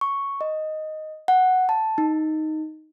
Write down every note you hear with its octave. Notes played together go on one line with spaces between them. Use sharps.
C#6
D#5
F#5
A5
D#4